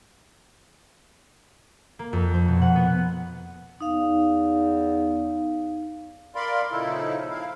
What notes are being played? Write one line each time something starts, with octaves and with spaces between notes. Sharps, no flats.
A#3
F2
C5
B2
F#5
B3
E2 D#4 F5
A#4 D5 F5 B5 C6
A#2 C#3 F3 D#4 E4 A4
C4 E4 F5